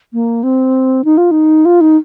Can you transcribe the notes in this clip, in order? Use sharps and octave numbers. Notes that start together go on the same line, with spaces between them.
A#3
C4
D#4
F4
D#4
F4
D#4